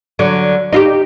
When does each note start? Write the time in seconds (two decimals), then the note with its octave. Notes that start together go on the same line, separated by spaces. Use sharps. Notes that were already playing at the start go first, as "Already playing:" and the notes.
0.19 D3 F#3
0.72 D#4 F4 G4